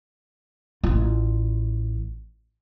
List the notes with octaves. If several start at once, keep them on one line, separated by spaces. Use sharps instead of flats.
A1 F4